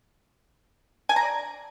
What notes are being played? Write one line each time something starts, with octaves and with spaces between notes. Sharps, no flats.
G#5
A#5
D5